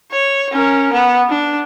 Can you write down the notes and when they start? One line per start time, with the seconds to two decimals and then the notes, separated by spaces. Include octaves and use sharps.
0.11 C#5
0.52 C#4 A#4
0.93 B3
1.29 D4